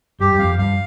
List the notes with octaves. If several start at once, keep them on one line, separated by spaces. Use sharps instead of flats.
G2 G4
G2
F2 F5
G2 F5